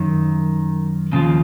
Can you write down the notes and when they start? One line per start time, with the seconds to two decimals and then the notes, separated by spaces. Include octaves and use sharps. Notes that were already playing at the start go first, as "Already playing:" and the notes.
Already playing: F#2 D#3
1.12 D#2 C#3 F3